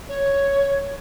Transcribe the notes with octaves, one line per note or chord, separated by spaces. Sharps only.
C#5